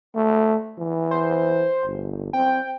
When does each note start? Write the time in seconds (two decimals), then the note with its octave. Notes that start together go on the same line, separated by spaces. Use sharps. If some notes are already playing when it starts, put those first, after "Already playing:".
0.16 A3
0.78 E3
1.11 C5
1.86 G1
2.33 C4 G5